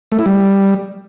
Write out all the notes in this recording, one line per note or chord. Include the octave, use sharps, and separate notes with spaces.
A3
E4
G3